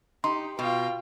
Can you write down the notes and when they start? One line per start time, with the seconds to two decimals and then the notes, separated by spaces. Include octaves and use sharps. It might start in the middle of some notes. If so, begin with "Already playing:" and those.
0.24 D#4 G4 C6
0.59 B2 F4 G5